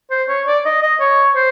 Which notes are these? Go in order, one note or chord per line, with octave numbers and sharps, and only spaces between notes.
C5
C#5
D5
D#5
D#5
C#5
C5